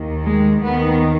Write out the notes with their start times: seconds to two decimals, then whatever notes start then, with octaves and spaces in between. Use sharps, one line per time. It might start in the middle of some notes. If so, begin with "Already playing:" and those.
Already playing: D#2 D#3
0.23 G#3
0.61 D#2 D#3 B3